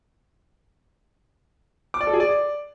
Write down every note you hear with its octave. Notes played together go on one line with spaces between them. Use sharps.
D6
D5
A4
G#4
D5